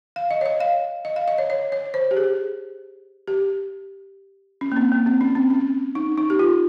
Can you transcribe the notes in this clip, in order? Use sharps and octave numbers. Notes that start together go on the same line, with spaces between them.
F5
D#5
C#5
D#5
F5
D#5
F5
D#5
C#5
C#5
C#5
C5
G4
G#4
G4
C#4
A#3
C4
A#3
C4
C#4
C4
C#4
D#4
D#4
G4
F4